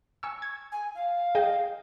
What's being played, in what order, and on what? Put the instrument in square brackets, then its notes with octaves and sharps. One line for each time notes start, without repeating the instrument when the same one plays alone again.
[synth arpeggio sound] G#5 C#6 E6
G#6
[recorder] G#5
F5
[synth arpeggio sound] G#4 D#5 G5